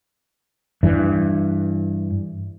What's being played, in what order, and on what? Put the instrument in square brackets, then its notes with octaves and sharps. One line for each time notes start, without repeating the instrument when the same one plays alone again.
[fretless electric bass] G2 E3